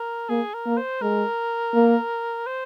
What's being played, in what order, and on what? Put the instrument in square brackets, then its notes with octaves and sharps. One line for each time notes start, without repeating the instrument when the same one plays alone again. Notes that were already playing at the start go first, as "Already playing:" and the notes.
Already playing: [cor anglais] A#4
[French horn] A#3 [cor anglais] G#4
[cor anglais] A#4
[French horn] A#3
[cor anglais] C5
[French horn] G#3 [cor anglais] A#4
[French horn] A#3
[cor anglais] C5